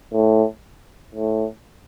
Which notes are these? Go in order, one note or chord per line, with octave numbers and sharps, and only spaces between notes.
A2
A2